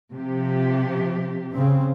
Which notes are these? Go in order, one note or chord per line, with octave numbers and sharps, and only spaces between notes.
C3 F3 G4
C#3 C4